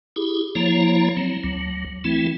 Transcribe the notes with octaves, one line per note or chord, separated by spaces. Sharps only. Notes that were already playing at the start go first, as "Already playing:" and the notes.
E4 G4 G#4
F3 A#3 E4 C#5 A#5
F#3 C4
D2 F#3
E3 A3 C4 E4